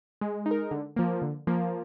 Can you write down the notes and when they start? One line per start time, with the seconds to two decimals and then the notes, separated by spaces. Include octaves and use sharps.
0.21 G#3
0.46 D#4
0.51 A#4
0.71 D3
0.96 F3 A#3
1.22 D3
1.47 F3 A#3